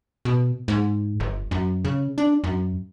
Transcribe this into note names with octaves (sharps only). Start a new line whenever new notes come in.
B2
G#2
G1
F#2
C#3
D4
F#2